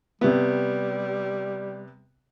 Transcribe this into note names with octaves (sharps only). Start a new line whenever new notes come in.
C3 G3 B3